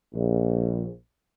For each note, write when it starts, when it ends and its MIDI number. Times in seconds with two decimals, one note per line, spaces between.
0.13 0.88 34